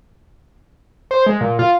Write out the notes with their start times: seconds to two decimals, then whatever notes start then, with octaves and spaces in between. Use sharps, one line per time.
1.11 C5
1.27 G#3
1.41 A#2
1.59 F4